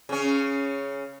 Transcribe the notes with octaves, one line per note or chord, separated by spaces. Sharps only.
C#3 C#4